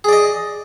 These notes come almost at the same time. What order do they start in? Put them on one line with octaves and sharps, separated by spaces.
G#4 D5 D#5